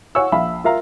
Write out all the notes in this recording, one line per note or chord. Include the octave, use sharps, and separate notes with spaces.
C#5 F#5 G#5 C#6 E6
A#1 E5 F5 B5
F4 A#4 E5 F5 A#5